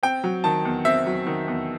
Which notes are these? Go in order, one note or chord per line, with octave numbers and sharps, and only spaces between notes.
C4 G5
F#3
D#3 A5
E2
C4 E5
F#3
D#3
E2